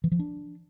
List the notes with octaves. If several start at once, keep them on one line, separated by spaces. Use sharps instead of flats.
E3
F3
D4